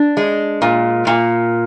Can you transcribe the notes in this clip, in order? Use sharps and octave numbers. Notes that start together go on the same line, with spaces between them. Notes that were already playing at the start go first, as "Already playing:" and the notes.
Already playing: D4
G#3
A#2
A#2